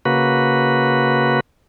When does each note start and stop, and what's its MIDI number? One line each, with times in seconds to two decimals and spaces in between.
0.05 1.40 49
0.05 1.40 58
0.05 1.40 66
0.05 1.40 71